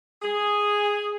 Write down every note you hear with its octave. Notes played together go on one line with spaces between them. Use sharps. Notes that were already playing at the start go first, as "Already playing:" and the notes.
G#4